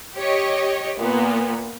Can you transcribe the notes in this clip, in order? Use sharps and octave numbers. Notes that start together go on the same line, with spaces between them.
G4 C#5 D#5
A#2 A#3 B3